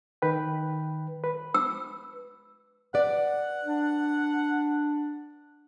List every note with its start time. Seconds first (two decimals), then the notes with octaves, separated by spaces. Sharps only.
0.22 D#3 B4 G5
1.24 B4
1.54 E6
2.94 B4 D5 F#5
3.65 D4